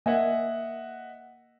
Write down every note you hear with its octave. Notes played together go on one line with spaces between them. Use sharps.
A#3 D#5 E5 F#5 G#5